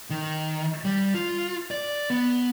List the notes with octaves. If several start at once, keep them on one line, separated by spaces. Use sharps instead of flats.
D#3
G3
F4
D5
B3